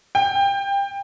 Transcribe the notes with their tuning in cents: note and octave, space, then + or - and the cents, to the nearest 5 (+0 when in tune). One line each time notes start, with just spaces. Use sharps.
G5 +25